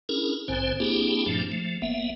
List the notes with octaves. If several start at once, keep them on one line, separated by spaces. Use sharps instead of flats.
C#4 D4 E4 G#4 A#4
A#1 G#2 D3 C4 C5 G#5
A#3 C4 D4 E4 G4 G#4
G2 A#2 F3 A3 D4
F3 A3
F#1 A#3 B3 E5